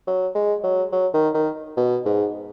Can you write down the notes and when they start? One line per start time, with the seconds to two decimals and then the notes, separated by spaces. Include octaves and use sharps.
0.07 F#3
0.35 G#3
0.63 F#3
0.92 F#3
1.14 D#3
1.34 D#3
1.77 B2
2.05 G#2